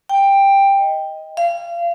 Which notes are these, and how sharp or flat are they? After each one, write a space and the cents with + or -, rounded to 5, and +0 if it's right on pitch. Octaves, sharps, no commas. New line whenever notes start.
G5 +10
D#5 +10
F5 -30